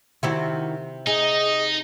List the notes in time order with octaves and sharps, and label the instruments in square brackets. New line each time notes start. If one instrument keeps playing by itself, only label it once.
[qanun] C3 C4 D6 [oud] D#3 E4 F#4
[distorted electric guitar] D#4 [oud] G#4 [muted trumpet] D#5